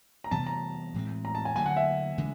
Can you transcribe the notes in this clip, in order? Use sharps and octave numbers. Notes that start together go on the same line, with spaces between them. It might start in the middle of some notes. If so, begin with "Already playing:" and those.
A#5
C3 E3 G3 B3 A5
A#5
A2 E3 G#3 C4
A#5
A5
G#5
D3 F#3 A#3 G#5
F#5
E5
C#3 E3 G#3